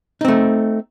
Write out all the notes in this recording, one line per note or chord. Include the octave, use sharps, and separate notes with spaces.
A3 C4 D#4